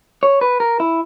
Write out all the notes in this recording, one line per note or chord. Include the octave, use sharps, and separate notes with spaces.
C#5
B4
A#4
E4